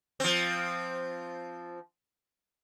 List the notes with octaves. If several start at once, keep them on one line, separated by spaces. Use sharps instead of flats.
F3 C4